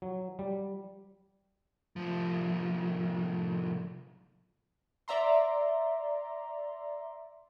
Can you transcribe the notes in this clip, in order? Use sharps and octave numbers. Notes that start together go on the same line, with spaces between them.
F#3
G3
C2 F3
D5 E5 A#5 C6